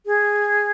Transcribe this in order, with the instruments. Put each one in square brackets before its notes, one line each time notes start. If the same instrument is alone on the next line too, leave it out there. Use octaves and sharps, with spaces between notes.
[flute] G#4